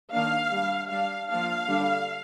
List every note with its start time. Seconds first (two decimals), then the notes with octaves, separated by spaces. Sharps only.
0.12 D#3 A#3 D4 F5
0.51 G3 D4
0.90 G3 D4 F5
1.29 F3 A#3 D4 F5
1.68 D3 G3 D4